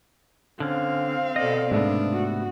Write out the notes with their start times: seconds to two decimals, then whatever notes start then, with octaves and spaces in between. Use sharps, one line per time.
0.60 D3 C4 C#4 F5
1.36 B2 A4 D5 D#5
1.72 G#2 C3 A3 B3 D4
2.13 F#4